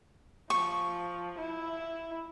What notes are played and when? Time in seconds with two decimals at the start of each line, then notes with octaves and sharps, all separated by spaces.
0.50 F3 C#6
1.38 E4